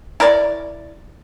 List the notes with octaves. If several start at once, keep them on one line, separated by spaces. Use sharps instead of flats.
E4 A#4 C#5 D5